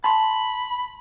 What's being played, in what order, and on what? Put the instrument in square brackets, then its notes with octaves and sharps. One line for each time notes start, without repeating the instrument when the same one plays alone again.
[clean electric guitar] A5 C6 [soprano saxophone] B5